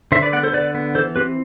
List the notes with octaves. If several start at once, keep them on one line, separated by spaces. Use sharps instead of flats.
D3 C5 E5
B4 D5
B3 D5 F#5
A4 C5
D3 B4 D5
B3
E3 A4 C5
C4 G4 B4